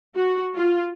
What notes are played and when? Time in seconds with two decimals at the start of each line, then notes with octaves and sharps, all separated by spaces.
0.15 F#4
0.55 F4